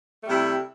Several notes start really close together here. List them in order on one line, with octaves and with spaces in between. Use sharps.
A3 G3 C3 E4